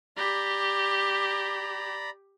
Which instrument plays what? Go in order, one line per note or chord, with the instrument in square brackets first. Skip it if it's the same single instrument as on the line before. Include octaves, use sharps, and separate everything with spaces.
[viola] G4 [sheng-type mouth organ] D5 A#5 B5